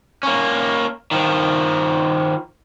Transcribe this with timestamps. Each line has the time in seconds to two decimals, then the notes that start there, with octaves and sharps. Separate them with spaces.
0.23 A#3 C#4
1.11 D#3 F3